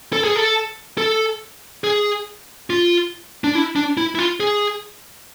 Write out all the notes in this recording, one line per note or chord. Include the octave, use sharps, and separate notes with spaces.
A4
G#4
A4
A4
G#4
F4
D4
E4
D4
E4
E4
F4
G#4